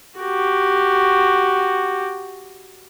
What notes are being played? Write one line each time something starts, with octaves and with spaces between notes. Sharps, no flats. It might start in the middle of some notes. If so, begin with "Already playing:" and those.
F#4 G4